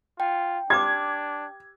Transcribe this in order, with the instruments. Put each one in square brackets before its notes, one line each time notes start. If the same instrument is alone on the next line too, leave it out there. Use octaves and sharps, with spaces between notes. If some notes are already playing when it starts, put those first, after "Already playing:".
[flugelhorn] F4 [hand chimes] G5
[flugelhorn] D4 [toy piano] G4 B4 D6 [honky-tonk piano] G#6